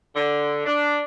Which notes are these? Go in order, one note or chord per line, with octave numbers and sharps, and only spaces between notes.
D3
D4